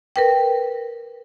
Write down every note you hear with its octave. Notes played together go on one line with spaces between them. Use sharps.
A#4 B4 G5